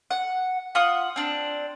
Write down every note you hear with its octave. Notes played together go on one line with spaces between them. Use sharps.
F#5
F4 F#5 D#6
C4 D4